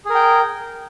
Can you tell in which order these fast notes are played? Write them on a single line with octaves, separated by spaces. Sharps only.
G#4 A#4 G5